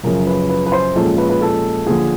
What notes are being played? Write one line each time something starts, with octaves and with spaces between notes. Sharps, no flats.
F#2 C#3 F3 A#4
B4
B4
B4
C5
A#2 F3 G#3 C#4 A4
B4
B4
A4
D#2 D3 F3 G#4